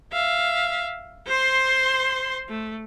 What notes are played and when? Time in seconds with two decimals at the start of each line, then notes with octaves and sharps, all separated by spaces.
0.13 E5 F5
1.27 C5 C6
2.49 A3